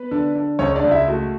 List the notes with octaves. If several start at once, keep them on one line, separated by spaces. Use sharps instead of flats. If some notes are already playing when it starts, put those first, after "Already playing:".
Already playing: B3 B4
D3
D3
C#2 C#4 C#5
D4 D5
C#2
E4 E5
A3 F#4